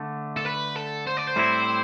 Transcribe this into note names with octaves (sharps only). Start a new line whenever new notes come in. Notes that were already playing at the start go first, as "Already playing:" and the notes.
Already playing: D3 A3
A4
B4
A4
C5
D5
C5
A2 G3 C4 E4